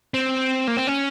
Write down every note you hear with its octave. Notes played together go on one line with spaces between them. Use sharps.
C4
A#3
C4
C#4